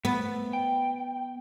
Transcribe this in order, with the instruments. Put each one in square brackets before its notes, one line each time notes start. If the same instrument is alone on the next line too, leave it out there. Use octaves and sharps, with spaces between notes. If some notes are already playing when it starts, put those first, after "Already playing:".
[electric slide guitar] A3 [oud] B3
[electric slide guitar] G5